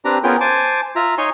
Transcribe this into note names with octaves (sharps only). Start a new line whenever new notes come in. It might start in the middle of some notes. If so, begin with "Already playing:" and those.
C4 D4 G4 B4 A#5
B3 C#4 F4 G#4 A#4 G5
C5 G#5 A5 D6
F4 E5 A#5
D#4 C#5 G#5 C6 C#6